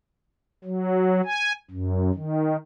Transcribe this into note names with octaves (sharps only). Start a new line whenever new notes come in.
F#3
G#5
F#2
D#3